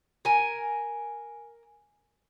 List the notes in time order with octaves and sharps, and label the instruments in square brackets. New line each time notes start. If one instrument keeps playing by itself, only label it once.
[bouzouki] A#4 G#5